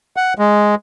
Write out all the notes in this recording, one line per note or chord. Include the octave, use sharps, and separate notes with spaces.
F#5
G#3